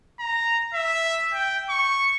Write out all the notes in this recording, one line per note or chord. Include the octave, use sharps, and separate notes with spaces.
A#5
E5
G5
C#6